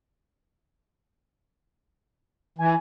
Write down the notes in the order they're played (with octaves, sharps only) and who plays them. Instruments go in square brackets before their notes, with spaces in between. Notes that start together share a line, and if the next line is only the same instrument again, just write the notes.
[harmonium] E3 [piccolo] G#5